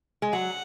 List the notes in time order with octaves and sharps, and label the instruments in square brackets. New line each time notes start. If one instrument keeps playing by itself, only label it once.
[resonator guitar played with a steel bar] G#3
[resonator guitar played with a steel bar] F#3 [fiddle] F#5